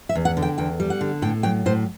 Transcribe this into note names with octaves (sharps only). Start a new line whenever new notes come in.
E5
E2
F#5
D3
G5
E2 G5
G3
F#5
D3
A2 G5
F#3 G5
A2 C5